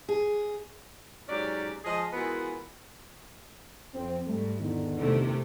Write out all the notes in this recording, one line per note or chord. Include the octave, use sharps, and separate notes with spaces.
G#4
G#2 F#3 C#4 G4 D5
F3 G#3 G#4 D#5
E3 G#3 B3 F4 F#4 A#4
F2 C4
G#2 G3 A3
E2 D3 D#3
C3 A3